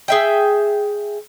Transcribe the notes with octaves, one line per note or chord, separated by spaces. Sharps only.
G#4 E5 G5